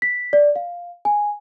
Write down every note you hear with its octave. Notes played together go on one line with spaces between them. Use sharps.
B6
D5
F5
G#5